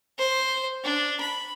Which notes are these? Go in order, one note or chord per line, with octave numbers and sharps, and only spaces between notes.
C5
D4
B5